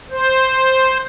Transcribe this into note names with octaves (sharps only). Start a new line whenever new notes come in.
C5